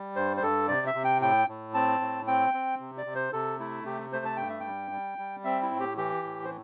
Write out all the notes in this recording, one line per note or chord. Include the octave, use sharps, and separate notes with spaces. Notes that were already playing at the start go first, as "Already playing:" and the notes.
Already playing: G3
G2 C5
C5
G2 A4
C3 D5
E5
C3
G5
A2 G5
A2
C4 A5
A2
C4 G5
C4
C3
D5
C3
C5
C3 A4
A3 E4
C3 G4
A3 C5
A5
G2 G5
E5
G5
G3
G3
G3
C4 E5
E4
A2
G4
E3 G4
A2
C5